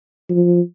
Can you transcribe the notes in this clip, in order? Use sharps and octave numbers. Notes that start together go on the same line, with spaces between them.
F3